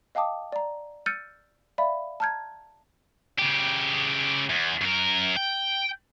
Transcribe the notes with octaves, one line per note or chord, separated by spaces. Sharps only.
D#5 F5 G5 A5 D6 D#6
D5 A#5
E6 F6 G6 A6 C#7 D#7
D5 E5 F5 B5
A5 A#5 F6 G6 G#6
C#3 G4
E2
F#2 A#4
G5